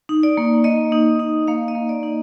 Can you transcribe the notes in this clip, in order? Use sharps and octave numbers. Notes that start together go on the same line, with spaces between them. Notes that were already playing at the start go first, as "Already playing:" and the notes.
D#4
D5
A#3
A#3 D#5
D#4
D#4
A#3 F5
D#5
A#3
D5
D#4